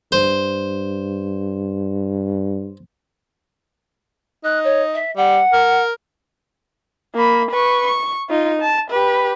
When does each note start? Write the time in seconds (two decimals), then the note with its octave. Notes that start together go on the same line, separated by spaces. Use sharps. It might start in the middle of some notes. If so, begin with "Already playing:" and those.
0.12 G2 C5
4.44 D#4 F#6
4.64 C#5
4.94 E5
5.16 G3 F#5
5.53 A#4
7.15 A#3 B5
7.51 B4 C#6
7.87 C#6
8.30 D#4 F4
8.61 A5
8.90 G4 B4